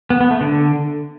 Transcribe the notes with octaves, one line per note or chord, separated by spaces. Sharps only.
B3
B3
A3
D3